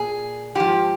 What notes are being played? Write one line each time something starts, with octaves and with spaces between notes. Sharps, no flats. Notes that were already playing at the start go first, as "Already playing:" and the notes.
Already playing: A#2 G#4
G#2 F3 G4